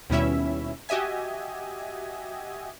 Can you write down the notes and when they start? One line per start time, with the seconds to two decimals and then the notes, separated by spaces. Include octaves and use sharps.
0.10 D#2 B2 G3 C#4 E4 E5
0.89 F#4 G4 D#5 E5 G#5